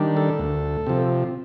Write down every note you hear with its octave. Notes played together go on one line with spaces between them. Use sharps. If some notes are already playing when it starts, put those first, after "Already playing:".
Already playing: D#3 G3 D4
A4
D2
C3 F3